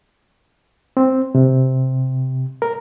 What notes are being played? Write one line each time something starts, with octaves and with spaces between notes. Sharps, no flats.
C4
C3
A#4